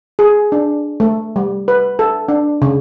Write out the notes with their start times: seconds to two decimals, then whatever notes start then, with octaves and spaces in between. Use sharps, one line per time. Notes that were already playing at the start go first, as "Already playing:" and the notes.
0.19 G#4
0.52 D4
1.00 A3
1.36 G3
1.68 B4
1.99 A4
2.29 D4
2.62 C#3